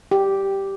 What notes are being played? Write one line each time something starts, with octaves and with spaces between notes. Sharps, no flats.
G4